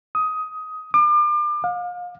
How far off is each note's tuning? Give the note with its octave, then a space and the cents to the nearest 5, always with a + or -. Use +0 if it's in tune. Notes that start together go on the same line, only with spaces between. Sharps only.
D#6 +15
D6 +35
F5 +35